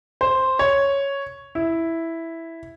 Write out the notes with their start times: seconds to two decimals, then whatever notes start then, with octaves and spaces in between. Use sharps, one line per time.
0.21 C5
0.59 C#5
1.55 E4